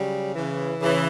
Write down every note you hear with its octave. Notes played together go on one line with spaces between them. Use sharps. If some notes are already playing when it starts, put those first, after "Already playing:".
Already playing: C#3 F#3 G3
C#3 E3
C#3 E3